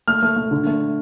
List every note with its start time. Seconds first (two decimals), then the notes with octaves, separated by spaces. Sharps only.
0.08 A3 F6
0.23 A3
0.36 A3
0.51 D3
0.67 A3